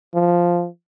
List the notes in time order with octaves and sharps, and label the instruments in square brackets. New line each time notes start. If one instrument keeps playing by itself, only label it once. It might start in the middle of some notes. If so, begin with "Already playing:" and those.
[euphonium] F3